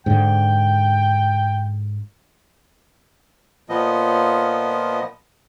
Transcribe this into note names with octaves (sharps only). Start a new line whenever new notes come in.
G#2 D3 G5
A#2 F3 B3 D#5